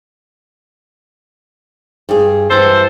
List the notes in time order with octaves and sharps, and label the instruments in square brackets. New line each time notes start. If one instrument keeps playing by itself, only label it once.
[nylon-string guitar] G2 G#4
[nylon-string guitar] G2 E3 [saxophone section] A4 C5